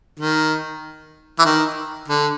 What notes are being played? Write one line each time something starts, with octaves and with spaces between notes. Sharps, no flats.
D#3
E3
D#3
D3